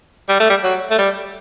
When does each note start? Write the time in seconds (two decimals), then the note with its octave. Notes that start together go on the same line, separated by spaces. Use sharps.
0.29 G3
0.40 A3
0.50 G3
0.63 F#3
0.90 A3
0.98 G3